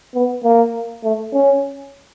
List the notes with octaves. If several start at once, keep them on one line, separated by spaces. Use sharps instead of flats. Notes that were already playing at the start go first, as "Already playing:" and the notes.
B3
A#3
A3
C#4